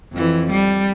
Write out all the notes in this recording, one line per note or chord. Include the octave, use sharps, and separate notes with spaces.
F2 E3
G3